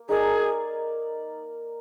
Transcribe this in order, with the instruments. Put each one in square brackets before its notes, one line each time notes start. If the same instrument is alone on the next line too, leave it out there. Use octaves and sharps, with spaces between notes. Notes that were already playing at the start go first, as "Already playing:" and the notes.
Already playing: [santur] A#3
[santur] D#4 A#4 D5 [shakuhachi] G#4